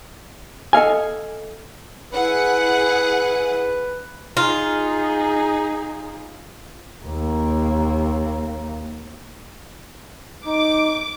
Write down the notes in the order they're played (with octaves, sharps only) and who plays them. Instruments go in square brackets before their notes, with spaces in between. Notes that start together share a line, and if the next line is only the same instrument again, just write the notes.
[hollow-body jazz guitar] A4 D#5 F5 G#5
[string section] E4 G#4 F#5 [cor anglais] B4
[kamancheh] D#4 G#4 [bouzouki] F4
[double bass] D#2 A#3
[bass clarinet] D#4 [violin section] D6